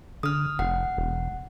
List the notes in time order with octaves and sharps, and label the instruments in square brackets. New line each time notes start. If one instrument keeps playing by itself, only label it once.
[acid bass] D3 [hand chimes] D#6 F6
[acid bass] F1 [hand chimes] F#5
[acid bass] E1